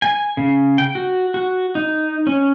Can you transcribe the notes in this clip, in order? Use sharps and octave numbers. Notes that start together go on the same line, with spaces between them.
G#5
C#3
G5
F#4
F#4
D#4
C#4